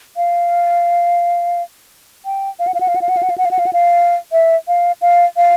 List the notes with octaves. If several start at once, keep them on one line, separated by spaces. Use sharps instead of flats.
F5
G5
F5
F#5
F5
F#5
F5
F#5
F5
F#5
F5
F#5
F5
F#5
F5
F#5
F5
F#5
F5
E5
F5
F5
F5